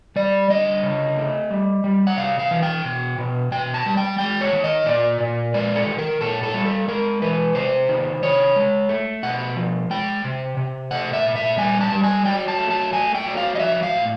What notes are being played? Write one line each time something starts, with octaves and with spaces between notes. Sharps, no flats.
G3 D5
D3 D#5
C#3
A3
G3
G3
F#5
C3 F5
F5
E3
G5
B2
B2
B2 G5
A5
G3
G5
G#3 G5
C#5
D#3
D#5
A#2 D5
A#2
G#3 D5
A4
D#3
A#4
A#2 A4
A4
G3
A4
G#3 A#4
E3 B4
C3 C5
D#3
C3 C#5
G#3
A3
B2 F#5
F3
G#3 G5
C3
C3
A3 F#5
E5
A#2
E5
G3 G#5
A5
G3
G#5
F#3 G5
A5
A3
A5
A3 G#5
G5
F#3
F5
D#5
F3 E5
F5
A2